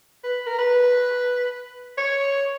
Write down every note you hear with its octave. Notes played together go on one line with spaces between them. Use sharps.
B4
A#4
B4
C#5